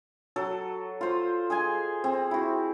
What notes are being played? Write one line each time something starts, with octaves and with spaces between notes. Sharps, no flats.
F#3 A4
F4 C5
G#4 D#5 G#5
C4
E4 F#4